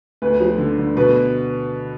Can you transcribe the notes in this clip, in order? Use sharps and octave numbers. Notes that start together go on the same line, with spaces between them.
D2 B4
F3
D3
D3
B2 B4